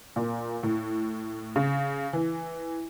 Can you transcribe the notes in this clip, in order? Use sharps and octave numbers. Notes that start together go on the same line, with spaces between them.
A#2
A2
C#3
E3